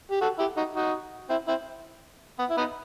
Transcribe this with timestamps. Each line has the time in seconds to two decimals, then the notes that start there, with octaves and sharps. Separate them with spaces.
0.11 G4
0.21 F#4 A4
0.39 E4 G4
0.57 D#4 F#4
0.75 D#4 F#4
1.29 C4 E4
1.48 C4 E4
2.39 B3
2.50 E4
2.57 B3 D#4